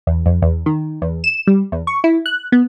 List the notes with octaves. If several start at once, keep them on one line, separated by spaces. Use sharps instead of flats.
E2
F2
E2
D#3
E2
E7
G3
E2
C#6
E4
F#6
B3